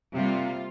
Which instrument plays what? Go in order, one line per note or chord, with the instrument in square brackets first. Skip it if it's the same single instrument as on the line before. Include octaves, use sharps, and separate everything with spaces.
[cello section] C3 G3 A#3 F4